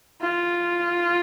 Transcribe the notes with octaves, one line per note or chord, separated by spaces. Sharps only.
F4